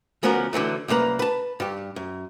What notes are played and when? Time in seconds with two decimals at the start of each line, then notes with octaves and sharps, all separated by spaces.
0.23 D2 F3 B3 C#4 F#4 A#4
0.53 D3 E3 F#3 A3
0.88 C2 F#2 A#3 B4 A#5
1.19 B4 A5
1.60 G2 G4
1.96 F#2